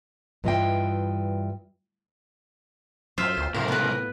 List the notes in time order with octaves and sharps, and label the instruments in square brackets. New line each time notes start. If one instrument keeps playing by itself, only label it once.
[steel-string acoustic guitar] G2 E3 F4 D#5 E5 G5
[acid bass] F#2 [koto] F4 E5 [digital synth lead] C5
[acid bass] D2
[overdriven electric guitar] C#2 C3 [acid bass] A2 [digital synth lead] A#4
[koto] B3 B4